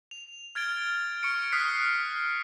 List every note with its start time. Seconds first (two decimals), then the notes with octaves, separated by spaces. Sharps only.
0.11 F7
0.55 F6 G#6 A6 D7 G7
1.23 C#6 F6 C#7 D7
1.52 D#6 F6 F#6 B6 C7